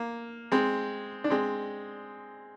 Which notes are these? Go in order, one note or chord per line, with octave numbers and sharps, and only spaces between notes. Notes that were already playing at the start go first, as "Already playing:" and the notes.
Already playing: A#3
G#3 C4
D4
G#3 C4